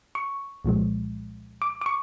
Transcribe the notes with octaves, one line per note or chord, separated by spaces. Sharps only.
C#6
C2 A#2 F3 G#3
D6
D6
C#6